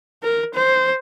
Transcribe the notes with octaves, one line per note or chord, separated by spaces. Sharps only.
A#4
C5